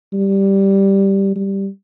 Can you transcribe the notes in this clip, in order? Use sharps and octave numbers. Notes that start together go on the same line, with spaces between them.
G3
G3